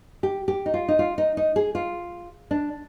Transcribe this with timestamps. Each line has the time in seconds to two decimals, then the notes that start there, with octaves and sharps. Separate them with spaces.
0.23 G4
0.48 G4
0.66 D#4
0.74 F4
0.88 D#4
0.99 F4
1.18 D#4
1.37 D#4
1.56 G#4
1.75 F4
2.51 D4